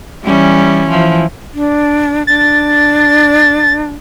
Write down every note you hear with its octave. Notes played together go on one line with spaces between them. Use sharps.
E3 G3 C#4
E3 F3
D4
D4 A6